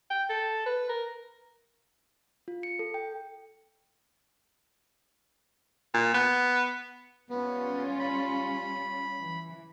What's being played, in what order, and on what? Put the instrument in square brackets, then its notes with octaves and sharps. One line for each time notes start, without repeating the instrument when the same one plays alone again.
[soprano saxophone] G5
A4
B4
A#4
[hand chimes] F4
C#7
A4
G5
[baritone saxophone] A#2
B3
[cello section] G3 C#4 F4 [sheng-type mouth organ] B3
[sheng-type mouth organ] B5
[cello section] E3